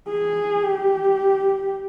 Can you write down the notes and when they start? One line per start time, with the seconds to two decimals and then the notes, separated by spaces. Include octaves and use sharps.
0.11 G#4
0.63 G4